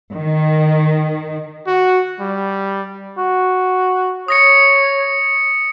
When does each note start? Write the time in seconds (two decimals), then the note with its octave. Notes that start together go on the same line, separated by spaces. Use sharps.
0.12 D#3
1.67 F#4
2.20 G3
3.18 F#4
4.28 C#5 D#6 A#6 C#7